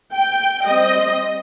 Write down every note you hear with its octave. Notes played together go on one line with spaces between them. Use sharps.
G5
G3 C4 D#5